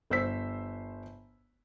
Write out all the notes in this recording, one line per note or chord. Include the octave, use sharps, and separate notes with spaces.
G1 C5 E6 B6